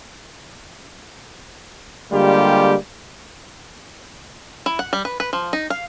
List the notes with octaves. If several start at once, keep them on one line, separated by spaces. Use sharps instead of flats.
D3 G3 G#3 A#3 F4 G4
E4
F#5
G3
B4
B4
F3
D#4
F5